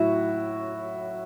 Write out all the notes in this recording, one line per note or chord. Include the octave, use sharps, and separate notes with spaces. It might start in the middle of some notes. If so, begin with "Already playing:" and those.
Already playing: A2 F#3 E4 F#4